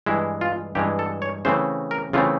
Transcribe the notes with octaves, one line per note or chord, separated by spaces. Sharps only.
G2 E3 G#3 E4
F4
G2 E3 G#3 G4
A4
C#5
C#3 E3 A3 C4 C5
A#4
C#3 E3 A3 C4 F4